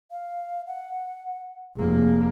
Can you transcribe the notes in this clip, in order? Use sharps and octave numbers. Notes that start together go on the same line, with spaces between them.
F5
F#5
F1 A#3 G#4